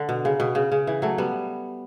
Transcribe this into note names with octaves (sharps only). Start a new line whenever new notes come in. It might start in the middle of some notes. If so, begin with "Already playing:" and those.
Already playing: D3
B2
C#3
B2
C#3
C#3
E3
F#3 A3
G3 B3